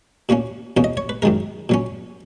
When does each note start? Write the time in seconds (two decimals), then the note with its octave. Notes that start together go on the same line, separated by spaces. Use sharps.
0.29 A#2 A#3 C#4 F#4
0.77 E2 B2 A#3 C#4
0.84 D#5
0.97 C#5
1.09 B4
1.22 F#2 D#3 G#3 A#4
1.69 A#2 F#3 C#4